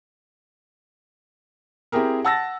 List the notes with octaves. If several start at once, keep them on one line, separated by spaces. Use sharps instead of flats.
C4 E4 G4 G#4 A#4
F#5 A5 E6 A6 A#6